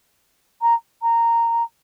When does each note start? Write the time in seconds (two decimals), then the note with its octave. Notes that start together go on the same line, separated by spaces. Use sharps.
0.61 A#5
1.02 A#5